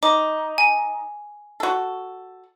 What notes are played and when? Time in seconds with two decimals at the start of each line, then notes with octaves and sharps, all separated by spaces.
0.03 D#4 D6
0.58 G#5
1.60 F#4 A4